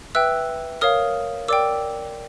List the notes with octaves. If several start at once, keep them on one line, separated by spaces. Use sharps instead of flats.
B4 E5 G5 E6 F#6
A#4 C#5 F5 D#6 F6
A#4 D5 G5 D6 E6